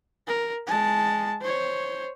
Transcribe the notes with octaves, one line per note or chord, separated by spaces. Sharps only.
A#4
G#3 A5
C5 C#5